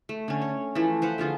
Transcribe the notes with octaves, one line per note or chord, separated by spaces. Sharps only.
A3
D3 C#4
C#5
E3 F3 A3
B4 C5 F5 F#5
D3 F3 F4 G#4